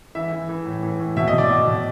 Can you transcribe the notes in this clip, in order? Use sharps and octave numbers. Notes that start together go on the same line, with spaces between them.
E3 E5
E3
E3
A2
E3
A2
B2 E5
D#5
B2
D5
B2 D#5
B2